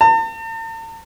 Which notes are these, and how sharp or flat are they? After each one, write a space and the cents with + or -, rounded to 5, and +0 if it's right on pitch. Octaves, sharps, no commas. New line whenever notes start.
A5 +45